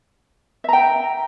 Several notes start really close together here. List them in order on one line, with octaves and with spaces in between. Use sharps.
E5 A#5 G5